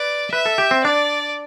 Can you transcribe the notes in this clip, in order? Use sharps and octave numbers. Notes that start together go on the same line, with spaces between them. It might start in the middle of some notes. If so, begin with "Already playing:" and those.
Already playing: B4 D5
B4 E5
A4
G4
C4
D4 D5